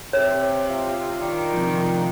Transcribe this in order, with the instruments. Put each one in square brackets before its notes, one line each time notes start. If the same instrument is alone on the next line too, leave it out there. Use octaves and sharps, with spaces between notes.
[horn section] C3 [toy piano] C#5
[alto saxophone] F4
[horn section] D#3 D4
[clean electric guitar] C3 F3